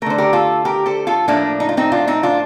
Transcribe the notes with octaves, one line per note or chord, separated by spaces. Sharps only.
D3 A3 A#4 C5
G4 A#4
F4 A4
G4 A#4
A4 C5
F4 A4
A2 F3 A3 A#3 D4
D#4
F4
C4 D#4
D4 F4
C4 D#4
D4 F4